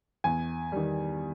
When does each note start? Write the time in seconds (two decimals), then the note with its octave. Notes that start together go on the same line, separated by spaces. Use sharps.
0.24 E2 G#5
0.72 D#3 G3